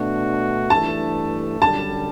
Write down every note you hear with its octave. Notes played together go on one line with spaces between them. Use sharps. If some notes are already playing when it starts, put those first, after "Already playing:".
Already playing: B2 A3 D4 F#4
G2 E3 A3 D4 A5
F#2 D3 G3 A5